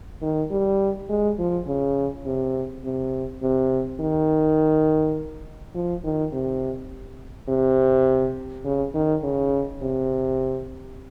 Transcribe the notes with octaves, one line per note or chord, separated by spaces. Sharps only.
D#3
G3
G#3
F3
C#3
C3
C3
C3
D#3
F3
D#3
C3
C3
C#3
D#3
C#3
C3